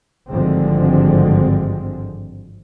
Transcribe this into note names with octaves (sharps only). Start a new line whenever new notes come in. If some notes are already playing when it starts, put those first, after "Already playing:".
G#1 G2 D3 F3 G#3 C4